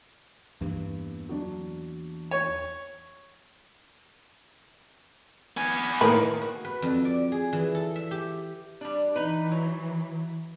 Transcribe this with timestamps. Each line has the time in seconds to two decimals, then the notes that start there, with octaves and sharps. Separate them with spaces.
0.61 E2 G2 E3 A#3
1.29 F#3 D4
2.31 C#5
5.57 B3 G#5
6.01 A2 D#3 A#3 B4
6.41 F#4
6.65 B4
6.82 F2
7.05 D5
7.32 G#4
7.53 E3
7.75 A4
7.96 E5
8.11 G4
8.81 G3 D4
9.16 E3 D#4 B4
9.51 F#3